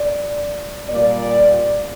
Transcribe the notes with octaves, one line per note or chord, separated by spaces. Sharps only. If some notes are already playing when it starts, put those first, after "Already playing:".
Already playing: D5
A#2 G3 A#3 D5